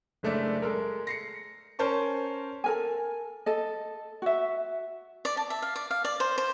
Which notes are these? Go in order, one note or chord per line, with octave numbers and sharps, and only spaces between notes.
F#1 G#3 A3 D4 D5 E5
G#3 A4 A#4
A#6 C7 C#7
C#4 A#4 C5 A5 C#6
A4 A#4 G#5
A4 D#5
F#4 E5
D5
A5
E5
F5
D5
F5
D5
C5
C5